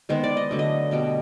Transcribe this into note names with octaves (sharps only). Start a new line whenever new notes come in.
D#3 G#3 B3 C5
D5
D#5
D3 F#3 A3
D#5
B2 G3 B3